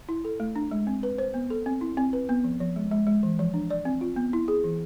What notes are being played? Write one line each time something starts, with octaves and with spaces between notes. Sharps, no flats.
E4
A4
A3
D4
G#3
C4
B4
C5
B3
A4
C4
E4
C4
B4
B3
F3
F3
G#3
G#3
G#3
E3
F3
D4
D5
C4
F4
B3
E4
G#4
E3